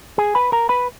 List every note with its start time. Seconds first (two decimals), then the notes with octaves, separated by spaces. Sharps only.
0.18 G#4 G#5
0.35 B4 B5
0.52 A#4 A#5
0.69 B4 B5